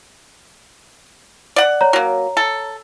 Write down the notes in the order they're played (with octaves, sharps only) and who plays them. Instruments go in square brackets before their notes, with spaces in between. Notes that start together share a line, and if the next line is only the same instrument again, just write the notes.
[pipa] D5 F#5
[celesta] C#5 A#5
[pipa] F#3 A#3
A4